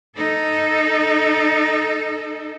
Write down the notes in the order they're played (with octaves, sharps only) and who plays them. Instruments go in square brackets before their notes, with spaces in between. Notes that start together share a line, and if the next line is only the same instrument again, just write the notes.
[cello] D#4 A4